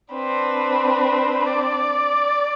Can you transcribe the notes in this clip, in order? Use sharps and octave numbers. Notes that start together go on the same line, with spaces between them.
C4 D4 B4
D5